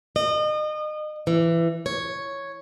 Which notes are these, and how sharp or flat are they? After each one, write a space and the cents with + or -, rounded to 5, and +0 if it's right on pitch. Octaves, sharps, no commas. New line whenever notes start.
D#5 -35
E3 +20
C#5 +0